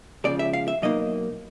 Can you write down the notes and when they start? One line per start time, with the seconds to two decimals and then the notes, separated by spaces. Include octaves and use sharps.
0.24 C#2 C#3 F3 D5
0.39 E5
0.53 F5
0.68 E5
0.82 B2 F#3 A#3 D#4 D#5